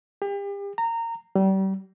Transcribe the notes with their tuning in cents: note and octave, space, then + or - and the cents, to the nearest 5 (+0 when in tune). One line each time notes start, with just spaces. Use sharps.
G4 +40
A#5 -20
G3 -35